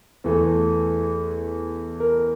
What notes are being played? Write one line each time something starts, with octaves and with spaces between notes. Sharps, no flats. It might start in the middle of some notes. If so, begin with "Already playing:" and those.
E2 E3 A3 A4
A#4